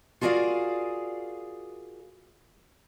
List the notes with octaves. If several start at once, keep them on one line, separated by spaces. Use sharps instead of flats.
F4 F#4 G#4 A#4 D5 F5